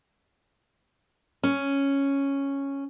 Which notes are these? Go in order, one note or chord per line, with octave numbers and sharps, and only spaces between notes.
C#4